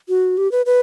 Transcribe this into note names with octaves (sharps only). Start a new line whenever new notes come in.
F#4
G4
B4
B4